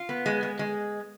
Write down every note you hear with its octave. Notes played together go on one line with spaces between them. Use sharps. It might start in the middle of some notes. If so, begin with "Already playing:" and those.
Already playing: F4
B3
G#3
G#3
G#3